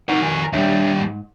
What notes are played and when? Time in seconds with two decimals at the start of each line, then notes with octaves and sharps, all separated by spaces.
0.09 C2 D#4 A#4 C#5 F#5
0.21 F2 D#3 G#5
0.53 D#2 G3 D4 C#5 E5
0.99 G#2